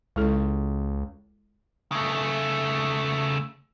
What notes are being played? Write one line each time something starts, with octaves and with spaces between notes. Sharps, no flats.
C#2 G#3 E4 A4
C#3 A3